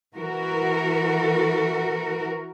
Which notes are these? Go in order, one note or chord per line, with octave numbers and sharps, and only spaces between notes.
E3 F#4 A#4